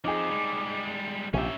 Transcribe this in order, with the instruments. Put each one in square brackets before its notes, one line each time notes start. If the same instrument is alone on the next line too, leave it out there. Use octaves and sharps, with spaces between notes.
[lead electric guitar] F2 F3 [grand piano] D#4 G#4 [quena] D6
[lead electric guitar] G3 G#3
[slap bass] A#1 C3 [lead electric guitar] C#4 E5 [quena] G4